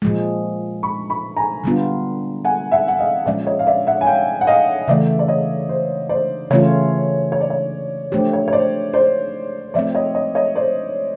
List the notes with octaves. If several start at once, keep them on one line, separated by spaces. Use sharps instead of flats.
A#2 F3 G#3
B5 C#6
B5 C#6
G#5 A#5
D3 G3 B3 D4 F4
F#5 G#5
E5 F#5
F#5
D#5 F5
A#2 F3 G#3 C#4 D5 E5
C#5 D#5
F5
D5 E5
E5 F#5
G#5
F5 G5
F#5
D#5 F5
C#3 E3 A3 D5 E5
D5
C#5 D#5
C5
C5 D5
C#3 E3 A3 C#4 F4 C#5
C#5
D5
C#5
F3 A3 D4 G4 C5
C#5
C#5
C5 D5
C5 D5
F3 A3 C4 D5 E5
C#5 D#5
C#5 D#5
C#5 D#5
C5 D5